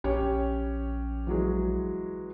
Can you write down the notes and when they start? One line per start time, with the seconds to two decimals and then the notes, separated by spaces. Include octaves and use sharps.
0.04 A#1 C#4 G4 C#5
1.27 E3 F#3 G#3